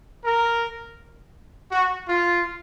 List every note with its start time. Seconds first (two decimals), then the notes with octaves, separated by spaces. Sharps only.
0.24 A#4
1.71 F#4
2.08 F4